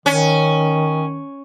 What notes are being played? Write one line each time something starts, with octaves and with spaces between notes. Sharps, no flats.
D#3 C#4